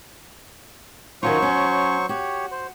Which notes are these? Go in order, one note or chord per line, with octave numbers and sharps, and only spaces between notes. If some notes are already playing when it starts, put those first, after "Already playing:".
D#3 F#3 C#4 F4 C5 C#6
C#4
F#4 G4 C#5
C5